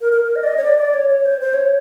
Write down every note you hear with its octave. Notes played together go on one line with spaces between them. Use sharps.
A#4
A#4
A#4
D#5
D5
D#5
C#5
D5
D5
C#5
C#5
C5
C5
C#5